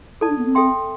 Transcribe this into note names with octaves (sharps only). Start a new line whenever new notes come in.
E4 A4 D5 A5
D4
B3
C4
A4 E5 G5 C6